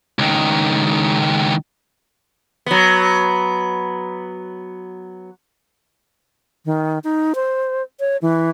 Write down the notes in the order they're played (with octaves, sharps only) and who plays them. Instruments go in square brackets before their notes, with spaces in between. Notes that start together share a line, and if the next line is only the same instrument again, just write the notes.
[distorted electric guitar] C#2 D#3
[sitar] F#3 B3
[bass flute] D#3
D#4
C5
C#5
E3